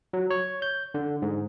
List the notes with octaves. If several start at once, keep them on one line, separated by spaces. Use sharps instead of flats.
F#3
C#5
G6
D3
G#2